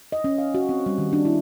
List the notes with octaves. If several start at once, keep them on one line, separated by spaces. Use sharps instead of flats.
D#5
C#4
F5
F#4
C4
G3
D#3
D4
E4